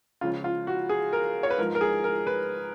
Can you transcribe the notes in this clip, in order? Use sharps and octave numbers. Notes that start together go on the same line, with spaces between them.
C#2 C#3 F3 F4
F4
F#4
G#4
A#4
C#5
B4
G#2 F3 A#4
A#4
G#4
A#4
B4